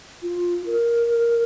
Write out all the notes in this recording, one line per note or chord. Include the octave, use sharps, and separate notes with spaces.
F4
A#4